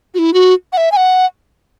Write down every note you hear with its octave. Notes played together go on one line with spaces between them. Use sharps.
F#4
E4
F#4
F#5
E5
G#5
F#5